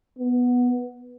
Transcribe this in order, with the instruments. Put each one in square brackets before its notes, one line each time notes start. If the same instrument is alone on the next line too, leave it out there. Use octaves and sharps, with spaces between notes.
[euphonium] B3